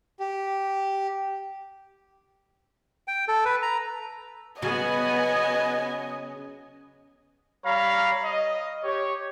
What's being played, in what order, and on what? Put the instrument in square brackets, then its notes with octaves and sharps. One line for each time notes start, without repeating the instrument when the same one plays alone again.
[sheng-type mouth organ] G4
[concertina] G5
A4
B4
A#5
[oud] C#3 F#3 [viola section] B3 G#5 [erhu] D#5
[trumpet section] G3 C#5 F5 A#5 B5
D#5
G4 C#5